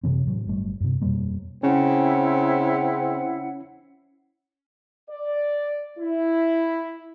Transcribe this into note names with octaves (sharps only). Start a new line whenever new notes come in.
F#2 C3 E3 C4
A2 F#3
G1 G3 A3
G2 C3
F2 B2 G3 A#3
C#3 C4 C#4 E4 F#5
D5
E4